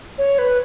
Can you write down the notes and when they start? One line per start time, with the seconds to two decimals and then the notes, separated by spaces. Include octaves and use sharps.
0.18 C#5
0.38 B4